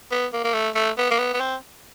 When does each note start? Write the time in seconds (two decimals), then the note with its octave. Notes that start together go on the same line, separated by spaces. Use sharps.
0.12 B3
0.33 A#3
0.44 A#3
0.54 A3
0.75 A3
0.98 B3
1.11 A#3
1.19 B3
1.34 B3
1.41 C4